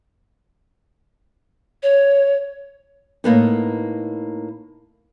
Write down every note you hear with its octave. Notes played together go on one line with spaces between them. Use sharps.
C#5
A2 A#3 B3 D#4